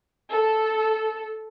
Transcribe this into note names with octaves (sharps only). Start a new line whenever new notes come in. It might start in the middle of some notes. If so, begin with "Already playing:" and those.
A4